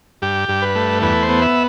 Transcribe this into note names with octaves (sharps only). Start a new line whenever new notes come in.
G2 G4
G2
B4
A3
E2 B4
C5
B3
E5